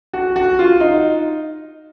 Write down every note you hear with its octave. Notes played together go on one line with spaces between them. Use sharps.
F#4
F#4
F4
D#4